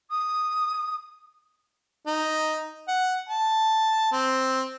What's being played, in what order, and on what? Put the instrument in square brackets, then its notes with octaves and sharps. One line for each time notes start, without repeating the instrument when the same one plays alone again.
[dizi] D#6
[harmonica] D#4
F#5
A5
C4